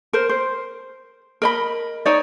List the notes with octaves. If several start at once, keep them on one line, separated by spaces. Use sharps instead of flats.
A#4 C5
C5
A#4 D#5 B5
D#4 C#5 D5